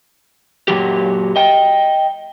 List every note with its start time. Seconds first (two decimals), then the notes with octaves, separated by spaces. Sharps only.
0.68 F#2 A#2 E3 F#3 G4
1.36 D#5 G5